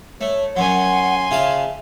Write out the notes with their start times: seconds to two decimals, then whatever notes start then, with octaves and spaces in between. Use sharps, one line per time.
0.21 A3 C#5
0.57 F#2 F#3 F#5 G#5 C6
1.31 C#3 F4 E5 A5